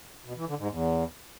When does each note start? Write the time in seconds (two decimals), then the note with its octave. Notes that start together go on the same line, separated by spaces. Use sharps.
0.25 B2
0.36 E3
0.47 D3
0.58 G#2
0.69 E2